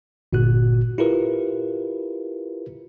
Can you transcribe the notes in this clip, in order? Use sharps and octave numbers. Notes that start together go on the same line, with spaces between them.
G1 A#2 F#4 F#6
E4 F4 G4 A#4 B4